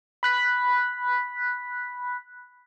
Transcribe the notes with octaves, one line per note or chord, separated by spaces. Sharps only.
B5 F#6 B6